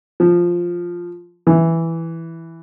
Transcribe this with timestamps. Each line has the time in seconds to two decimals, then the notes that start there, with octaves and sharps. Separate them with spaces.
0.20 F3
1.47 E3